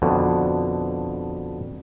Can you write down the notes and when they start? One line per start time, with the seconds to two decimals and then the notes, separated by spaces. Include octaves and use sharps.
0.02 F2 B2 D3